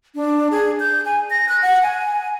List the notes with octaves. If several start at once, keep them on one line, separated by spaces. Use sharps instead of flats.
D4
G#4
G6
G#5
A#6
F#6
F#5
G#5